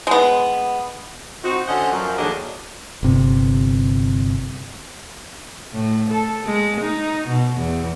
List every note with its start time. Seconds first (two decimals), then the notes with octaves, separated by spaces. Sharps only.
0.07 G#3 B3
1.44 C4 D#4 F#4
1.68 D3 C#4 C5 D#5 F#5
1.92 F#2 F3
2.18 D#2 D3 F#3 D4 G#4 D#5
3.03 G1 C3
5.73 A2
6.11 A4
6.45 G#3
6.81 D#4
7.28 B2
7.57 E2